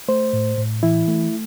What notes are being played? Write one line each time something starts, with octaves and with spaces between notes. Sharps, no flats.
A3 C5
A2
A2
E3 E4
A3